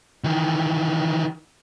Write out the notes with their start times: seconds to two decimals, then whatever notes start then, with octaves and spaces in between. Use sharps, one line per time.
0.24 D#3 E3